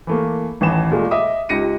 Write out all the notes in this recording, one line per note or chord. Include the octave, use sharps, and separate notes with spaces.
E3 A3 A#3
A1 D#2 E3 E7
A#2 G#3 A3
D#5 E5 D6 D#6
C#2 D#4 G4 A#6 C#7 D#7